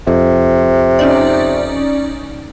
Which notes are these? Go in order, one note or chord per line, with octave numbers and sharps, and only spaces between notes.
F2 C3
C#4 D#4 D5